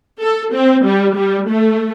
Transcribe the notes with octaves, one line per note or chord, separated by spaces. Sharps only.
A4
C4
G3
G3
A3